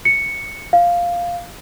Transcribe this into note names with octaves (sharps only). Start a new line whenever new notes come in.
C#7
F5